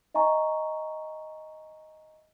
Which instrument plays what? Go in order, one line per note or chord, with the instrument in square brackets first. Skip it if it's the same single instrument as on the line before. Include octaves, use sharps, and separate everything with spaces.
[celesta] D#5 E5 G#5 A#5 C#6